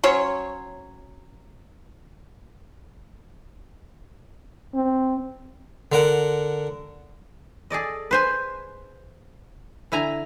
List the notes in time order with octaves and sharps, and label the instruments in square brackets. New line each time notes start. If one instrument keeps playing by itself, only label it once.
[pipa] F#3 C#4 C5 C#5
[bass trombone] C4
[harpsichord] D3 A#4 F#5
[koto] G#4 A4 D5 D#5
B4 C5 G#5
D3 E4 G#5 A#5